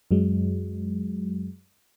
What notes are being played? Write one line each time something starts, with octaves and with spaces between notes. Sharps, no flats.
F#2 F#3 G#3